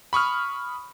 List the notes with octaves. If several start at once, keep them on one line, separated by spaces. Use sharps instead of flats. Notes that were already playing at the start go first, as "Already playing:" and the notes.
B5 C#6 D#6 F6